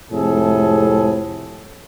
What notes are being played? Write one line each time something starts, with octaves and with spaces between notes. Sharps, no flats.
F2 A2 C3 G#3 G#4 A4